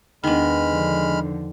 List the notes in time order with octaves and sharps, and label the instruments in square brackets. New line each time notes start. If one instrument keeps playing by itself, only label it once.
[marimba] E2 D4 [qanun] D#3 B3 [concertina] G#3 B5 F6
[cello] D3 F3